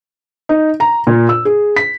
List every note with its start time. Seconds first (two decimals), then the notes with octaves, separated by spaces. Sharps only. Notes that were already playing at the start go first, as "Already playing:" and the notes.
0.49 D#4
0.80 A#5
1.07 A#2
1.29 E6
1.45 G#4
1.76 B6